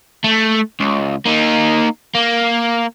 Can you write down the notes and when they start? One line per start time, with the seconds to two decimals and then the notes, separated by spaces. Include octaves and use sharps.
0.24 A3
0.80 C#2
1.26 A#3 D#4
2.15 A#3